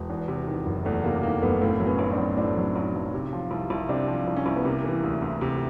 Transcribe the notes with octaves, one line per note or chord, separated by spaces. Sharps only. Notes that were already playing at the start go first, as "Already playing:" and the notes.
Already playing: E1
E2
C3
D#3
F#1
E2 A3
C3 A#3
D#3 A#3
F#1 A3 B3
A2 A#3 C4
F#3
B3 C#4
B1
C4 D4
B1
A2 C4 D4
F#3
B1
B1
C3
F3
C2
C2
C3 C4 D4
F3
C2
C#4
C2 C4
B3
C3 A#3
E3
D2
D2
C3